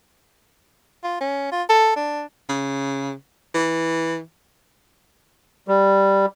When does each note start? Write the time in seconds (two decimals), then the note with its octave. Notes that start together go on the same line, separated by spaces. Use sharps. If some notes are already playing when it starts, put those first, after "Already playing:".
1.04 F4
1.21 C#4
1.52 F4
1.69 A4
1.96 D4
2.49 C#3
3.54 E3
5.68 G3